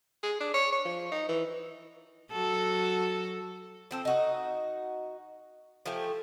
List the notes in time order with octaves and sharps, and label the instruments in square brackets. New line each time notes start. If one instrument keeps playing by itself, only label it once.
[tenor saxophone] G#4
D4
C#5
C#5
F3
D#4
E3
[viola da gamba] F#3 F#4 A4
[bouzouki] F3 C4 A4
D#4 F#4 D#5
F3 A3 G4 G#5